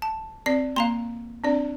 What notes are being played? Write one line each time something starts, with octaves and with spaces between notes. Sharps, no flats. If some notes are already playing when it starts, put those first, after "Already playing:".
A5
C4 D5 C7
A#3 F5 A#5 C6
C4 D4 D5